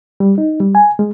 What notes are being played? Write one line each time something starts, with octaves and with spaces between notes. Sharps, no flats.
G3
D#4
G3
G#5
G#3